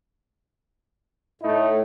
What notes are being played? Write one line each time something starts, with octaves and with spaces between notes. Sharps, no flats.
A2 A3 D#4 E4